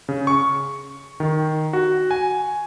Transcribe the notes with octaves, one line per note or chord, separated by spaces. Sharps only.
C#3
C#6
D#3
F#4
G#5